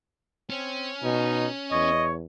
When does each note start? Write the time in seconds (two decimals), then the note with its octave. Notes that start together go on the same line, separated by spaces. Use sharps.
0.50 C4 C#4
1.03 B2 D#4
1.72 E2 C#5 D#5